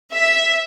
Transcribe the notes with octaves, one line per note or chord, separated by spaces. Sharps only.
E5